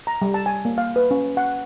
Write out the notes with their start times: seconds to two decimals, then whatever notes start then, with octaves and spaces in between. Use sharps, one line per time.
0.07 A#5
0.22 G3
0.34 A5
0.46 G#5
0.65 A#3
0.78 F5
0.96 B4
1.11 C#4
1.37 F#5